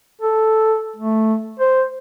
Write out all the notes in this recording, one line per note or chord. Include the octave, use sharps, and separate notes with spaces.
A4
A3
C5